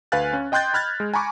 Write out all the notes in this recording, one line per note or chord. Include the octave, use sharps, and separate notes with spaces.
D2 B4 F5 G#5 F#6 A6
C#4
D#5 G5 C6 F#6 G6 A6
B5 F6 F#6 G#6 A6
G#3
G#5 A#5 B5 C#6 D6